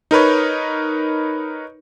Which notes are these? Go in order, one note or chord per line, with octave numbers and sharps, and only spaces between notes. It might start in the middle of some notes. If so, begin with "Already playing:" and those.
D#4 A#4 B4 C#5